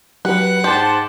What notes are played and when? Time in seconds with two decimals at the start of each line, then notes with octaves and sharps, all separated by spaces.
0.25 F#3 G4 B4 F#5
0.64 G#2 G4 C5 A5 C6 D6